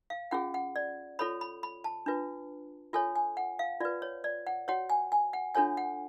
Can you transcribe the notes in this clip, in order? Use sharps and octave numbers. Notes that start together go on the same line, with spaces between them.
F5
C#4 F4 G#4 F#5
F#5
D5
F4 A4 C#5 B5
B5
B5
A5
D4 F4 B4
F4 A4 C#5 G#5
G#5
F#5
F5
F4 B4 D5
C#5
D5
F#5
F#4 C#5 F#5
G#5
G#5
F#5
D4 F4 A4 C#5 G#5
F#5